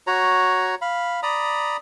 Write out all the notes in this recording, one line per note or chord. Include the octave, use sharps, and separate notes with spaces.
F#4 C#5 A#5
F5 B5
D5 A#5 B5 D#6